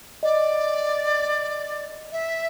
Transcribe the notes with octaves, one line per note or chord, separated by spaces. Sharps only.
D5 D#5
E5